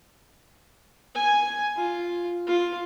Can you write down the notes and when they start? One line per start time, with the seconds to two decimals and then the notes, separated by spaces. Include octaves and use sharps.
1.15 G#5
1.76 F4
2.47 F4